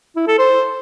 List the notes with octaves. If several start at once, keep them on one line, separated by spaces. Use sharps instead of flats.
E4
A4
C5